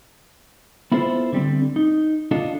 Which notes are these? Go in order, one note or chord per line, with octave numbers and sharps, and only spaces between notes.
B3 E4 F4 A4 C5
D3 G3 C4
D#4
D4 F4 A4 D#5